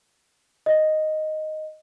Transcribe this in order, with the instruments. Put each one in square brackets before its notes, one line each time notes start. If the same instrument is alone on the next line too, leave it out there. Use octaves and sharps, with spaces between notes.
[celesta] D#5